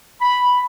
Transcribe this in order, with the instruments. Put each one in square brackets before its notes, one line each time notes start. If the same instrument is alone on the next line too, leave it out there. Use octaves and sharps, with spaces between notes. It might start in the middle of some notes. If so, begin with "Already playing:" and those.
[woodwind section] B5